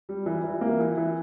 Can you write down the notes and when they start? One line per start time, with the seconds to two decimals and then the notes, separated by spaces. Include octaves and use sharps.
0.09 G3
0.26 E3
0.44 E3
0.61 A#3
0.80 E3
0.97 E3